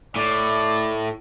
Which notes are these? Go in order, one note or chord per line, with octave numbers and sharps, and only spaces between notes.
A2 D5